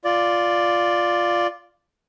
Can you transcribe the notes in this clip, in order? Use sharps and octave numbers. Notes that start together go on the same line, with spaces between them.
F4 D5